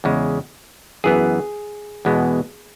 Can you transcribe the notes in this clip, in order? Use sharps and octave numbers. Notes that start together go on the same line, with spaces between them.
E2 C#3 G#3
F#2 E3 B3 G#4
E2 B2 G#3 B3